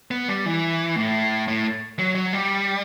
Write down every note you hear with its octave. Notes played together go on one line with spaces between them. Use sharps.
B3
G3
E3
A2
A2
F#3
F#3
G3